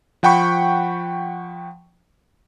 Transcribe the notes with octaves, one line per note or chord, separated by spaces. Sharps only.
F3 F#5 G5 B5 C#6